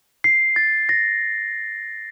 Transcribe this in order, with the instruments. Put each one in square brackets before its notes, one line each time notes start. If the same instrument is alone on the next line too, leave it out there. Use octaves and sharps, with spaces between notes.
[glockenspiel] C7
A6
A#6